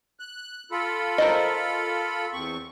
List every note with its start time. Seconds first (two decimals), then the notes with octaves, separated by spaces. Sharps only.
0.20 F#6
0.71 F4 A4 B5
1.18 A#4 C5 D#5
2.33 E2 C4 C#6